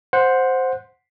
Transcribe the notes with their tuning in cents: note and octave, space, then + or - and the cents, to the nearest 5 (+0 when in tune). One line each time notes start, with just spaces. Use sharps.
C5 +0 F#5 -15